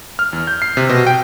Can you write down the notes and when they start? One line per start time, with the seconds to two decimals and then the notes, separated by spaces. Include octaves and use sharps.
0.19 F6
0.33 E2
0.47 G6
0.62 C7
0.77 C3
0.89 B2
1.07 G5